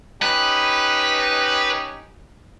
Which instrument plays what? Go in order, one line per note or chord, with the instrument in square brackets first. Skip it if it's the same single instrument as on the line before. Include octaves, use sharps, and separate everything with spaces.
[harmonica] C#4 D#4 G4 [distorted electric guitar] B4